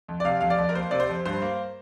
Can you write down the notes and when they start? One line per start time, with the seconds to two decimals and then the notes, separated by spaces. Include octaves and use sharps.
0.08 F2
0.20 D5
0.25 C3 F5
0.41 F2 F5
0.50 D5
0.58 F2
0.69 A#4
0.75 A#3 C5
0.91 C3 D5
1.00 C5
1.09 F2
1.25 G2 C5
1.42 A#3